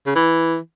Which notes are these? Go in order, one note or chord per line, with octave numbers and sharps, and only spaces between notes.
C#3
E3